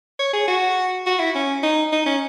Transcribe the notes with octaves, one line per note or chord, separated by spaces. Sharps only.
C#5
G#4
F#4
F#4
E4
C#4
D#4
D#4
C#4